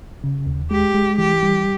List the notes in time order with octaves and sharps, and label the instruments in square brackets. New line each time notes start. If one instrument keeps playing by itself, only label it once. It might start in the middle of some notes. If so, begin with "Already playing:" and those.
[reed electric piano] C#3
D#2
[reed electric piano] G#3 [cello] G4
[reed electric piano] G#3
[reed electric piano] E3 [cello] G4
[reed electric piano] G3